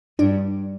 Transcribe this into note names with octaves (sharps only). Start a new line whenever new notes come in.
G2 D4 D5